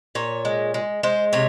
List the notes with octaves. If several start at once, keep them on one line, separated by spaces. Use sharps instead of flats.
A#2 C#5
G#3
G#3
G#3 C5
C3 C#5